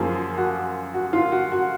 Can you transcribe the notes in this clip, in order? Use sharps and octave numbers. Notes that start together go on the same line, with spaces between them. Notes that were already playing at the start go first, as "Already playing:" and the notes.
Already playing: F#2 F3 A#3 F4 G#4
F#4
F#4
F4
F#4
F#4